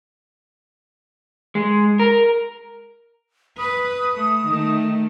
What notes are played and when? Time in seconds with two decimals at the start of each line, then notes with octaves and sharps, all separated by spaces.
1.55 G#3
1.99 A#4
3.58 B4 D#6
4.16 A3
4.49 D#3 A3